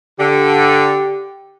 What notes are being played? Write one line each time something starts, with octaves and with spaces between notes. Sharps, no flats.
D3 G4